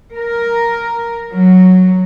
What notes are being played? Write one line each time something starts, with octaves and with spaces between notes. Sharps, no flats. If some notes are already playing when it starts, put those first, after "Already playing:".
A#4
F#3